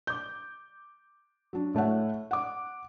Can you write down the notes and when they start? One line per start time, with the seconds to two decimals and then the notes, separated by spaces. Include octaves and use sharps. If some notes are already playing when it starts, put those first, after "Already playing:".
0.07 D6 G6
1.53 F#3 D4
1.74 A2 A3 C#5 F#5
2.31 F#5 D6